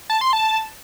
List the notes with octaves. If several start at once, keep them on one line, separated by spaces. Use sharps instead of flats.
A5
C6
A5